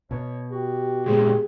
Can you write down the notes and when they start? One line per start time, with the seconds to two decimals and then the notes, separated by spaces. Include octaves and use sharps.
0.11 B2 C#5
0.51 F#4 G4
1.06 A#2 G#3 B3 G#4